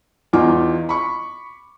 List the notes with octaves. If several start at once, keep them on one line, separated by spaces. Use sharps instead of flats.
E2 D#4 F4 D6
B5 C#6